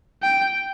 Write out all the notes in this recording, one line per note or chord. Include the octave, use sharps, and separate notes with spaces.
G5